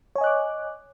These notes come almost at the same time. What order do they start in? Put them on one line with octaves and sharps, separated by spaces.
C#5 G#5 D#5 F#6 D6